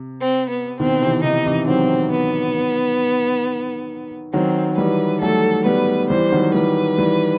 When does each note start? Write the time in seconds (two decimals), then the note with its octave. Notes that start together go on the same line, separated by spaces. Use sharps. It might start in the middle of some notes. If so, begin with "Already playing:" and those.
Already playing: C3
0.21 C4
0.50 B3
0.80 B2 D#3 C4
1.02 C3 E3
1.24 C3 E3 D#4
1.46 C3 E3
1.68 D#3 F#3 C4
2.12 B3
4.33 D#3 F#3 C4
4.78 E3 G3 B4
5.22 F#3 A3 A4
5.66 G3 B3 B4
6.10 E3 G3 C5
6.32 D#3 F#3
6.54 E3 G3 B4
6.98 E3 G3